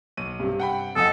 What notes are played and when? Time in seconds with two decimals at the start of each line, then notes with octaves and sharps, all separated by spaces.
0.17 B1 D#7
0.40 G2 C3
0.60 F#5 G5 B5
0.96 F2 A4 D#5 F#5 G#5 D#6